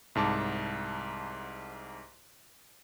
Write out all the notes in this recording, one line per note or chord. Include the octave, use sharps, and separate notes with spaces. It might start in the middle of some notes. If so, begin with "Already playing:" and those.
C2 G#2 A5 D6